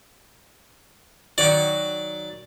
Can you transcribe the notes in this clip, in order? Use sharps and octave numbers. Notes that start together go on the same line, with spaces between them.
D#3 F#3 F#4 D5